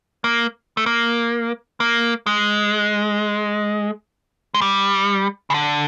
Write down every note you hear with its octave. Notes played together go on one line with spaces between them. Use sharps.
A#3
A3
A#3
A#3
G#3
G#3
G3
C#3
D3